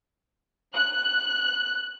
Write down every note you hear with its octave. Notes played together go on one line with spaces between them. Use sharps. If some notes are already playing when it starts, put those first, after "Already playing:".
F#6